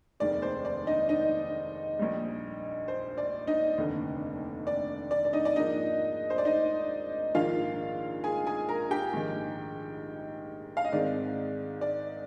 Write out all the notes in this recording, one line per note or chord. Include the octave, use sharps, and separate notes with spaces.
F1 D#2 D#3 G#3 D5
C5
D5
D#4 D#5
D#4 D#5
A#1 A#2 G3
C5
D5
D#4 D#5
F1 D#2 D3
D5
D5
D5
D#4 D#5
D5
G#2 F3 A#3 D4 D#4 D#5
C5
D5
D#4 D#5
A#1 G#2 D#3 A#3 F4 F5
G#4 G#5
G#4 G#5
A#4 A#5
G4 G5
A#1 G#2 D#3
F5
D#5
G#2 D#3 G#3 C4 D5
D5